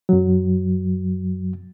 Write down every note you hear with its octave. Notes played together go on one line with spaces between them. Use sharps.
F#2 F#3